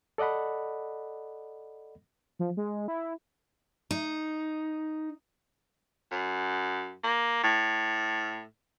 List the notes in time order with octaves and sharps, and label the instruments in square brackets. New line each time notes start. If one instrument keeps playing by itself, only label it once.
[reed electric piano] A4 D5 D#5 F#5 B5
[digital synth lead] F3
G#3
E4
[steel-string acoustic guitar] D#4
[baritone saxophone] F#2
A#3
A2